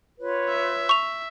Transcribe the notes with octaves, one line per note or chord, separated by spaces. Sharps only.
F4 B4 C#5
E5
C#6 F7